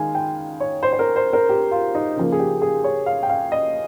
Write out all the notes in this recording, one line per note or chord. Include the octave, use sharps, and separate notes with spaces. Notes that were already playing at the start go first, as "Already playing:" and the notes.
Already playing: D#3 G#3 F5 G#5
G5
C#5
C5
C5
A#4
C5
A#4
G4
F4
D#4
C#3 F3 A#3
G#4
G4
G#4
C#5
F5
G5
F5
D#5